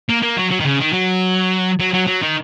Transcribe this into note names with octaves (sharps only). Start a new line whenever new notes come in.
A#3
A#3
F#3
F#3
D#3
C#3
D#3
F#3
F#3
F#3
F#3
D#3